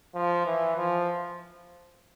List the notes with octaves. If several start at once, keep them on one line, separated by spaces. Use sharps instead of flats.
F3
E3
F3